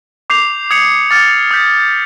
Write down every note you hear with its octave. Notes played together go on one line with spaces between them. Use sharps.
D6 G6 C7 F7
D#6 G#6 C#7 F7
D6 F6 A6 C#7
D#6 G6 B6